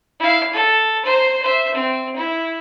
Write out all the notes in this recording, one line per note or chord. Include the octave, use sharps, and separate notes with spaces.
E4 F5
A4
C5 A#5
C5 E5
C4
E4